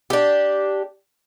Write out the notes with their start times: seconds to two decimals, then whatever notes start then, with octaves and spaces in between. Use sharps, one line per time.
0.10 D4 G4